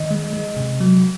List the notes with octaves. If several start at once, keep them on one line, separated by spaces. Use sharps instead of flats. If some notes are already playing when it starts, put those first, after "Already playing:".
Already playing: D#3 D#5
G#3
G#3
C3
F#3